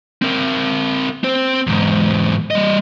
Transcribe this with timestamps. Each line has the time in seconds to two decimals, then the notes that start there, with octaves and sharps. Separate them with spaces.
0.22 C4 A#4
1.24 C4 C5
1.67 E2 G#2
2.51 G3 D#5